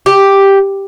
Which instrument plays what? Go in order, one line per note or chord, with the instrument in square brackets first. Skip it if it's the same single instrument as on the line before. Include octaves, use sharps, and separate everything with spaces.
[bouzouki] G4